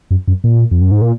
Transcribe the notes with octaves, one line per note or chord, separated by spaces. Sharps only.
F#2
F#2
A#2
F2
F#2
G#2
A#2